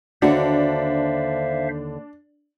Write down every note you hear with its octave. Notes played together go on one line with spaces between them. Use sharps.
D#2 D3 D4 F#4 C5 E5 F5